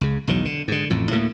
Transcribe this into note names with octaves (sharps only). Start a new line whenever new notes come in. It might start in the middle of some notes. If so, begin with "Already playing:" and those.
C#2 C#3
B1 E2 D#3 F#3
D3
G#2 D3
A1 F2 A2
D2 A2 A3 A#3